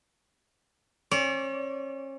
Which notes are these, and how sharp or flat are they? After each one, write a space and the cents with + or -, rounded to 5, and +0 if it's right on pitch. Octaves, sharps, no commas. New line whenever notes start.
C#4 -35 D5 -45